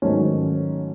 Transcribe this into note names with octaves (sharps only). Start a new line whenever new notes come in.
G#2 D#3 F#3 A3 C#4